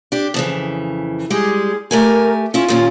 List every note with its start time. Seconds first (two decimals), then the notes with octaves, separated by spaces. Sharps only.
0.12 D4 G4
0.34 F2 C#3 E3
1.30 G3 G#3 G4 G#4
1.91 A3 G4 A#4 G#5
2.54 C#4 E4 F4
2.68 D#2 A#2 C#4